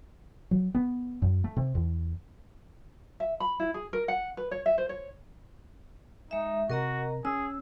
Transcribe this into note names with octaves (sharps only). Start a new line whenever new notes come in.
F#3
B3
F#2
A3
C3
E2
E5
B5
E4
G#4
A#4
F#5
B4
C#5
E5
C5
C#5
G#3 D#4 E5
C3 F#4 A#4 D#5 A#5
C#4 G#4 E6